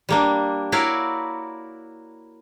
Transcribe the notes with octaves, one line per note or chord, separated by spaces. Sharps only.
G3 A#3 D4
E4 F#4 A#4 C#5 D5 F5